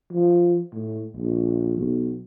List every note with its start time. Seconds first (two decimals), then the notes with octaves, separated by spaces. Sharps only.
0.12 F3
0.73 A2
1.17 A#1
1.77 B1